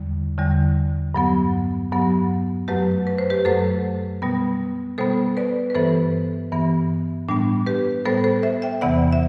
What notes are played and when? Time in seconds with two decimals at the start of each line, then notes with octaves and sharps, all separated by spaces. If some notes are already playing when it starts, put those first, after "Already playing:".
Already playing: E2 D3 G3
0.38 E2 D3 G3
1.14 G2 F#3 B3
1.92 G2 F#3 B3
2.68 F#2 F#3 A3 G4 B4
3.07 B4
3.18 C5
3.30 G4 B4
3.45 F#2 F#3 A3 A4 C5
4.22 B2 G3 B3
4.98 B2 G3 B3 A4 C5
5.37 B4 D5
5.70 B4
5.75 G2 E3 B3 A4 C5
6.52 G2 E3 B3
7.29 A2 G3 B3 D4
7.67 G4 B4
8.05 A2 G3 B3 A4 C5
8.24 A4 C5
8.43 C5 E5
8.62 E5 G5
8.81 E2 C3 E3 B3 D5 F#5
9.12 E5